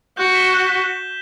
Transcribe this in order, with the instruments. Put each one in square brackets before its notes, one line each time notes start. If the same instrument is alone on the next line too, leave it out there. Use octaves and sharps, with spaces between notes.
[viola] F#4 [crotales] G6
[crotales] B6 E7 G7
G6
B6 E7 G7